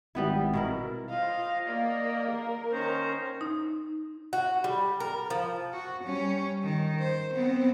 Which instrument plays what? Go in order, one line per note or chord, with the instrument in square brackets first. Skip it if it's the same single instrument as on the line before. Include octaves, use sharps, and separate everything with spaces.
[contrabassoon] G#1 [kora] G3 B3 E4
[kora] B2 E4 A#4
[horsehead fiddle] F4 C5 [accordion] D#5 [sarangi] F5
[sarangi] A#3 [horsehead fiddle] D5 F5
[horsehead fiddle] A#4
[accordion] D#3 C5 A#5 [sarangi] C#4
[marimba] D#4
[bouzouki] F#4
G3
A#4
F3
[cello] F#4
G3 C#4
D#3
C5
B3 C4